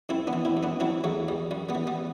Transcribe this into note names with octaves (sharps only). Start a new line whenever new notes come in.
F#2 C4 E4
B3 D4
E3
C4 E4
F#2
B3 D4
F#3 C4 E4
E2 F#3 A3
E2 G3
F#2 G3
G3 B3
E3
G3 B3